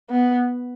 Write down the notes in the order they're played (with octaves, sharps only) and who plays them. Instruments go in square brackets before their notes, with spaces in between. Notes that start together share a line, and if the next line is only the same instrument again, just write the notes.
[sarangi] B3